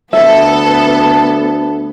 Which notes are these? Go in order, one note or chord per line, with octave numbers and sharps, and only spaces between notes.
D2 B3 A4 E5